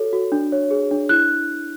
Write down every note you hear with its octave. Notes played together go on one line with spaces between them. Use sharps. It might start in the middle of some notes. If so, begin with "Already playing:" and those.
Already playing: F#4 A4 C#5
F#4
D4
C#5
G#4
D4
E4 F#6